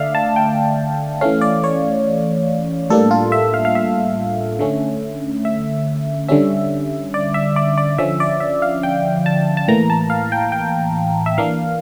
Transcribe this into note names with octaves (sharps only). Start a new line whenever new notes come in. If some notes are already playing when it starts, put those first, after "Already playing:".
Already playing: D3 A3 D5 E5 F5
A5
G5
E3 A3 C#4 F5
D5
C#5
A2 G3 A#3 D4 A4
F4
E5
F5
F5
E5
D3 A3 C#4
E5
D3 G3 C#4 E5
D5
E5
D5
D5
D3 F3 C#4 E5
D5
E5
F5
G5
A5
A5
A2 E3 A#3 A#5
A5
F5
G5
G5
E5
E3 A#3 D4 F5